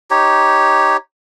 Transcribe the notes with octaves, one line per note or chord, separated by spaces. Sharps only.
D#4 G4 C#5